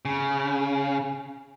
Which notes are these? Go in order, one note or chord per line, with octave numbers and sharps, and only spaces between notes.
C#3